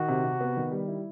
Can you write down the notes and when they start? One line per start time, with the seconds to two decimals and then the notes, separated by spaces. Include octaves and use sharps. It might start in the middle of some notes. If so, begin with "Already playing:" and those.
Already playing: D#3 F#4
0.08 C3
0.24 C3
0.40 B3
0.57 D#3
0.71 G3
0.88 E4